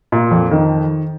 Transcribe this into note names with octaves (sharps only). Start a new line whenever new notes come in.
A#2
F2
D#3